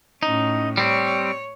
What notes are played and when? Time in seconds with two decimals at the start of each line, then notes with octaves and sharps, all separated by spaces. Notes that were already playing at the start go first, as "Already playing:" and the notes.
0.23 A2 C#4 D#4
0.77 G3 C4 C#5